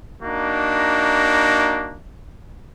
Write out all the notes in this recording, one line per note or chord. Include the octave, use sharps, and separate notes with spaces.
A#3 D4 D#4 F#4